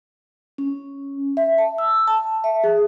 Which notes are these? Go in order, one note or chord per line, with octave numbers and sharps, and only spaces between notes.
C#4
E5
A5
E6
A5
E5
G#4